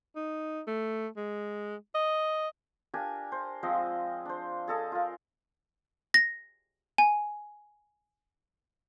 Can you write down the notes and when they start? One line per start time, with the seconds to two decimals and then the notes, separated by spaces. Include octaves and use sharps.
0.16 D#4
0.67 A3
1.17 G#3
1.95 D#5
2.94 D4 G4 A#4 G#5
3.32 C5
3.63 F3 G#3 C4 D#5
4.25 D4 C5
4.68 G#4 A4 D#5
4.92 F4 A#4
6.14 A#6
6.98 G#5